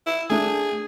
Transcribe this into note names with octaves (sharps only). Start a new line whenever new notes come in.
E4
A3 D4 G#4